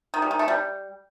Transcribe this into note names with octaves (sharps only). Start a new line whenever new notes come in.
D#3
G3
D#3
A3
G3